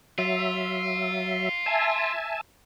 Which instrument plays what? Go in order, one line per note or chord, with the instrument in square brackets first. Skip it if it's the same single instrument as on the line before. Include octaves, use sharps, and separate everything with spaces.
[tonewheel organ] F#3 E5 [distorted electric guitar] F4
[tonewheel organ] E5 G#5 A5